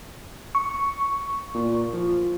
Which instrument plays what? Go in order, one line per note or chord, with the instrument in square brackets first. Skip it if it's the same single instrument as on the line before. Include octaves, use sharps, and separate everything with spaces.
[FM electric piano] C#6
[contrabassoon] A#2
F3